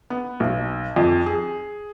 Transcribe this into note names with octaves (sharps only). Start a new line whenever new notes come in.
B3
B1
F2
G#4